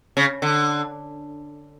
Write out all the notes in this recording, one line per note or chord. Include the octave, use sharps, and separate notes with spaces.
C#3
D3